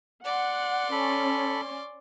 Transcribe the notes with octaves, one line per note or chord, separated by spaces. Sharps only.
D5 F#5 C6
C#4 A4 B5